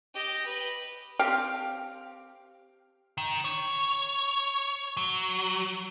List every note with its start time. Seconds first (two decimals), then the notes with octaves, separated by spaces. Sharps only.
0.14 G4 D#5
0.46 B4
1.19 C4 G4 F5
3.18 D#3
3.45 C#5
4.97 F#3